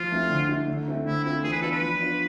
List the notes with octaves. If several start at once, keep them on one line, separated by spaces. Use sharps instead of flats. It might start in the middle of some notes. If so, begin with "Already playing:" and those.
Already playing: F3 F4
A3 C4 E4
D3
A3 E4
D3
A3 C4 E4
D3 E4
A3 C4 E4 F4
E3 G#4
B4
B3 D4 F4 A4
B4
F3
B3 D4 F4